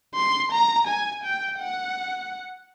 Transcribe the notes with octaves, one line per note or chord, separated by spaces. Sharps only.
C6
A#5
G#5
G5
F#5